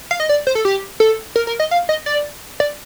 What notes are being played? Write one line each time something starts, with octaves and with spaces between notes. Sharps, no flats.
F5
D#5
D5
C5
A4
G4
A4
A#4
A#4
D#5
F5
D#5
D5
D5